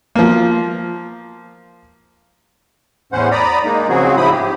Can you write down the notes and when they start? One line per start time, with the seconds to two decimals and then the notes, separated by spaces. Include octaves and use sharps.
0.15 F3 A#3
3.12 E2 A2 C#4 C5 F#5
3.31 D5 A#5 B5 D#6
3.64 G#3 A#3 D#4
3.89 C#3 F3 F#3 C4 F#4 G#4
4.17 G#2 C#3 F3 E4 B5 D#6
4.32 G4